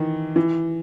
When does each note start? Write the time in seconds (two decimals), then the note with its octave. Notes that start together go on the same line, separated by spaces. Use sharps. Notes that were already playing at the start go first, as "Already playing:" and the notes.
Already playing: D#3 E3
0.36 E3